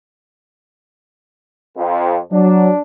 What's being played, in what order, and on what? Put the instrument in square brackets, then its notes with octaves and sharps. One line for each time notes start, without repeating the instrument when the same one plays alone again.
[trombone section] F2
[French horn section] F#3 [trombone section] D4